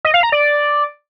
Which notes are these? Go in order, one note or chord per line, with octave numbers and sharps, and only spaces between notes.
D#5
F5
A#5
D5